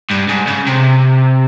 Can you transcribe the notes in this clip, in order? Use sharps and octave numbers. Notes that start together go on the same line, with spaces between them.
G2
G#2
C#3
C3